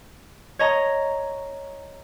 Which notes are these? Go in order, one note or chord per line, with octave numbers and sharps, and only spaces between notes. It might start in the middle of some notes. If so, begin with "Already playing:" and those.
C#5 D#5 A#5